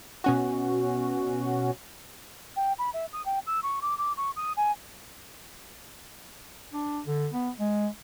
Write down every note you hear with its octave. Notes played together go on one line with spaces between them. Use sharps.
B2 C#4 F#4
G5
B5
E5
D#6
G5
E6
C#6
D6
D6
C#6
D#6
G#5
D4
D3
B3
G#3